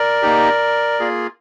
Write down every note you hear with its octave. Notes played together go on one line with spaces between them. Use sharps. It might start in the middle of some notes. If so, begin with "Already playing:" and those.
Already playing: A#4 D5
A#3 D#4 G4
A#3 F4 G#4